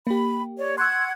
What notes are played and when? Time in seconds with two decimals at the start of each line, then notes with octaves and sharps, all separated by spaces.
0.07 A#3 G4 B5
0.58 C#5 D5
0.78 F#5 C6 C#6 E6 F#6 G#6